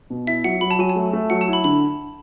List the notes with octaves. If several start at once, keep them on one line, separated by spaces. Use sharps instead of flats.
B2
E4 E5
F#3 F#5
F#3 B5
A5
F#3 G#5
A5
A3
A3
F#3 F#5
A5
E4
B5
D3 B5